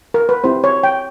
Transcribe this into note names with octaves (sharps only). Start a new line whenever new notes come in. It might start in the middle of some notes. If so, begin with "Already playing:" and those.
A#4
B4
C4 E4 G4 C5
C#5
G5